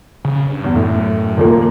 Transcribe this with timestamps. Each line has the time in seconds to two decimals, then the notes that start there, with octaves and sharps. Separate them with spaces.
0.25 C#3
0.46 G2
0.64 E2
0.75 F#2 A2
1.37 D#2 A#2 A#3